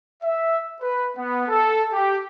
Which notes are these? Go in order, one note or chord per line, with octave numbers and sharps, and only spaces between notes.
E5
B4
B3
A4
G4